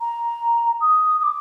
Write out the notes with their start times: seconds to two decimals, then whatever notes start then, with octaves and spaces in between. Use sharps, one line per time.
0.01 A#5
0.81 D#6
1.19 D#6
1.23 D6